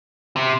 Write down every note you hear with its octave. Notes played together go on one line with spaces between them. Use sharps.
C3